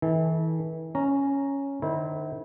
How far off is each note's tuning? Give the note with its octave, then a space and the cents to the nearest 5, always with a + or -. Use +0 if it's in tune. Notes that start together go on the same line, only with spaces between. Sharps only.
E3 -35 A4 -30
C#4 +0 A#5 +0
D#3 -40 E4 -30 C5 -5